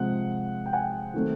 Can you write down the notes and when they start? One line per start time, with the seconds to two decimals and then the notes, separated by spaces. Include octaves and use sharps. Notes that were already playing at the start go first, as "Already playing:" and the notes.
Already playing: C3 F3 G#3 C4 F#5
0.66 G5
0.73 F#5 G#5
1.14 D#3 F#3 A3 C4